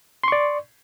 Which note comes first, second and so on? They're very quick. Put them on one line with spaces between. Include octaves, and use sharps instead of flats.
C6 C#6 D5